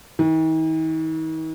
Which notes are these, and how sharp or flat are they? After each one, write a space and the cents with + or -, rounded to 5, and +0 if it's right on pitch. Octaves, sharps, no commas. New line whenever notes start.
D#3 +45